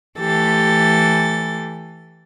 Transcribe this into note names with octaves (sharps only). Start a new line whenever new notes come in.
E3 A3 G4 A4 A6